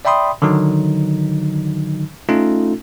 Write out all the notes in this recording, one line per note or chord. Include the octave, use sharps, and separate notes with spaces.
D5 E5 G5 B5 C6 D#6
D3 D#3 F#3 D#4
A3 C#4 D#4 F4 A4